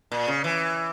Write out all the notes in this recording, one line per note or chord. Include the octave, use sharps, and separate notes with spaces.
A#2
C#3
E3